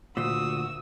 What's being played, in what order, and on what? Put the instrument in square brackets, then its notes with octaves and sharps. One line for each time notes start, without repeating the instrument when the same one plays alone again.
[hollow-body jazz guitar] D2 A#2 [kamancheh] F#4 D#6 [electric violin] E6